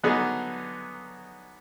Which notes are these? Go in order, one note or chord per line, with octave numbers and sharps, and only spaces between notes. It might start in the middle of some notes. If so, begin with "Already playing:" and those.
D3 F#3 B3 D#4 G#4